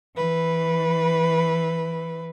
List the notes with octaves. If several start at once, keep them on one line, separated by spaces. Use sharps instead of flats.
E3 B4